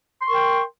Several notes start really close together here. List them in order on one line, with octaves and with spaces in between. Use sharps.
C6 C#6 A#4 G5